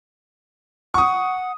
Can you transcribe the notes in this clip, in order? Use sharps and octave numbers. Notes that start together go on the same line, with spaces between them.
F#5 C#6 D#6